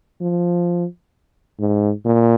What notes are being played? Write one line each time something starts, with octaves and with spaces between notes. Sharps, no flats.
F3
G#2
A#2